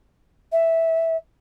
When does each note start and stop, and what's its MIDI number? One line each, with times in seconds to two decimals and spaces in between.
0.52 1.16 76